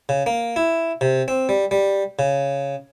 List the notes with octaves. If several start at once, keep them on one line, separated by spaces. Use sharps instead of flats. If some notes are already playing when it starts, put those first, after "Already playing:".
C#3
A#3
E4
C3
C4
G3
G3
C#3